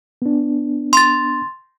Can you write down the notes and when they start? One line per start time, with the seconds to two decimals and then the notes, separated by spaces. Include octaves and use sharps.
0.22 B3 D4
0.93 C6 A6